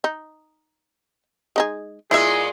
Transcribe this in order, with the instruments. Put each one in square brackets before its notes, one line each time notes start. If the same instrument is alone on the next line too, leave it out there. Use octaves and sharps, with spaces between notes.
[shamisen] D#4
G#3 D#4 G#4
[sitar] A#2 G#3 B3 [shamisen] E4 E5 [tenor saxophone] G#4